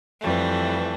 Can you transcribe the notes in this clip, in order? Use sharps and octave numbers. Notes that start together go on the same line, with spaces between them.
F2 E3 G3 A3